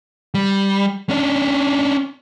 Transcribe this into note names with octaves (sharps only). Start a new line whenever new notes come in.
G3
C#4 D4